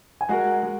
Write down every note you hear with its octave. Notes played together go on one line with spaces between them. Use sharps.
G#5
G#3 F#4 A#4 F#5
G#3